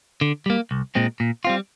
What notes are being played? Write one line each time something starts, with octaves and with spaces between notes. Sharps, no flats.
D3
G3 A#3
C2
A#2 G#3 C4
A#2
G3 C4 F4